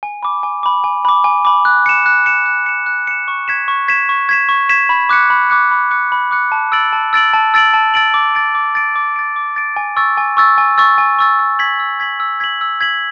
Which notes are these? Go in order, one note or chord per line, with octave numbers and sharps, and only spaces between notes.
G#5
B5 D6
G#5
B5 D6
G#5
B5 D6
G#5
B5 D6
F#6
C#7 E7
F#6
C#7 E7
F#6
C#7 E7
F#6
C#7 E7
C#6
G#6 B6 E7
C#6
G#6 B6 E7
C#6
G#6 B6 E7
C#6
G#6 B6 E7
B5
D6 F#6 C#7
B5
D6 F#6 C#7
B5
D6 F#6 C#7
B5
D6 F#6 C#7
A5
E6 A6 D7 F#7
A5
E6 A6 D7 F#7
A5
E6 A6 D7 F#7
A5
E6 A6 D7 F#7
D6
A6 D7
D6
A6 D7
D6
A6 D7
D6
A6 D7
G#5
C#6 E6 A6
G#5
C#6 E6 A6
G#5
C#6 E6 A6
G#5
C#6 E6 A6
E6
G#6 B6 F#7
E6
G#6 B6 F#7
E6
G#6 B6 F#7
E6
G#6 B6 F#7